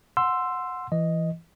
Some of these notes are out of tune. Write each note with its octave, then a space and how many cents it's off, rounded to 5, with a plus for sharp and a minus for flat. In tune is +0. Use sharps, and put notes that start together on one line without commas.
F#5 -20 C6 +0 E6 +15
E3 +15 D#5 +0